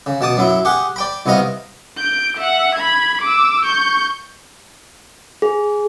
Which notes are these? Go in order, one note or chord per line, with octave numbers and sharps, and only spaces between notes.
C#3
B2 A5 D6 D#6
F#2 F#3 E4
G4 G#4 F#5
D5 G5 B5
C2 C3 B3 D#4 D#5 F5
G6 D7
E5 F#5
B5 G#6
D6 E6
C#6 G6
G#4